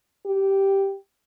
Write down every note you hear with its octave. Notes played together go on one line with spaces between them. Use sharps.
G4